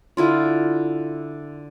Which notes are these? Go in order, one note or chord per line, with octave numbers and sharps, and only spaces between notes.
D3 E4 F4